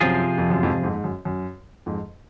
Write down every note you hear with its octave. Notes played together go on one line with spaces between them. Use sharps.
F#2 C3 F3 C4 F4 G#4
F2
F#2
F2 G#2
F2 G#2
G#2
F#2
F#2
F2 G#2